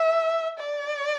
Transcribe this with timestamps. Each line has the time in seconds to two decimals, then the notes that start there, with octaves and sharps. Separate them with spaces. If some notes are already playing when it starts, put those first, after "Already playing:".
Already playing: E5
0.58 D5